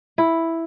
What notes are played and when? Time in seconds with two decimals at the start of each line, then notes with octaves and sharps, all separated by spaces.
0.18 E4